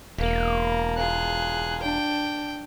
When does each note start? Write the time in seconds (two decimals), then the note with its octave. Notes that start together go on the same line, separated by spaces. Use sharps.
0.18 E1 A#3
0.98 F4 G#4 F#6
1.82 D4 G5